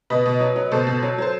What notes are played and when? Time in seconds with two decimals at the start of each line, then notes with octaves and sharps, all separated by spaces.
0.10 B2 B4 D#5
0.26 B2
0.40 F#3
0.56 F#3
0.72 B2 A4 C5
0.87 B2
1.02 F#3
1.18 F#3 C5